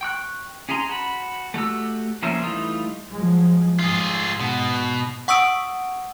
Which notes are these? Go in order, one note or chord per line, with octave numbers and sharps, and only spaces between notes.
G5 C#6 F#6
C#4 G#4 G#5 A#5 C6
F#4 A5 B5
A3 F#4 G4 E6
F3 A#3 C#4 C5 E5
E3 G3 A3 D#4 F4
F3 F#3 G#3
G#2 F4 G#4
B2
F#5 C#6 D#6 E6 D7